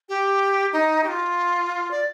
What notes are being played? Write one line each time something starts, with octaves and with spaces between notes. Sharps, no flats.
G4
D#4
G4
F4
D5